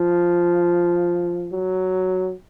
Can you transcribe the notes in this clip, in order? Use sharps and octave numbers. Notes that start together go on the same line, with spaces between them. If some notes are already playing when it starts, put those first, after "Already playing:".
Already playing: F3
F#3